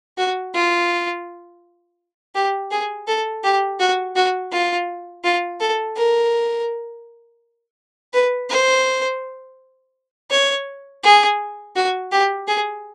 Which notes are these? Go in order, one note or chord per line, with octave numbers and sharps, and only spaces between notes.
F#4
F4
G4
G#4
A4
G4
F#4
F#4
F4
F4
A4
A#4
B4
C5
C#5
G#4
F#4
G4
G#4